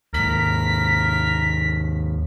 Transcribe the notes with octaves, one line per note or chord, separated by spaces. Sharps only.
D#2 G#2 A#4 B6